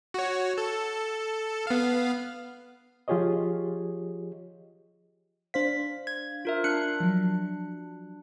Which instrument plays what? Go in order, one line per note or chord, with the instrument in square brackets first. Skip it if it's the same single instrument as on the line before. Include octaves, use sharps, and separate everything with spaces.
[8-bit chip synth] F#4 C#5
A4
B3 F5
[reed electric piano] F3 F4 G4 G#4 C#5 D#5
[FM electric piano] D4 C5 F5 [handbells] B6
[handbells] G#6
F4 A#4 E5
[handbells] D4 F#6 C#7 [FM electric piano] C7
[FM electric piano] F3 F#3